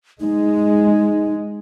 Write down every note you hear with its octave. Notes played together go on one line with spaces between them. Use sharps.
G#3 D#4